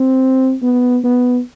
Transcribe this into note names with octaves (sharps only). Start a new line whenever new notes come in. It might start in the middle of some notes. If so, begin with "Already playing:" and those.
Already playing: C4
B3
B3